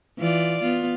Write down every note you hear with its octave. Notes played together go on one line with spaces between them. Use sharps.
E3 F4 D5
B3 F4